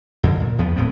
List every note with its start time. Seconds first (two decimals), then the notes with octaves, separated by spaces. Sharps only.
0.23 F2 D3 D#3
0.40 A#2
0.58 E2 F3 B3
0.76 D#1 A2 B3 C4